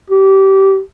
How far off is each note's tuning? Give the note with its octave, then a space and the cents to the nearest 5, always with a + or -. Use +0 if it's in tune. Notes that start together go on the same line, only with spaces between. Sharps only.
G4 -20